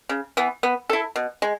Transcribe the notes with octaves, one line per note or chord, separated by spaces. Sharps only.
C#3
E3 B3
B3
E4 A4
B2
G#3